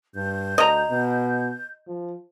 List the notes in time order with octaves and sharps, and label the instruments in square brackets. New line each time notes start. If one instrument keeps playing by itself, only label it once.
[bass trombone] G2 [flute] G6
[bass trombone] D2 [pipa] D#5 A#5
[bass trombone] B2
F3